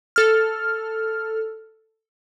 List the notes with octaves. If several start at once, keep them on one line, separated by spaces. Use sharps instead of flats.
A4 F6